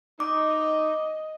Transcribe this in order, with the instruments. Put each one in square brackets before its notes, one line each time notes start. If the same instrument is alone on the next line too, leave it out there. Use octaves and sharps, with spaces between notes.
[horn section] D#4 [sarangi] D#5 [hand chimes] D6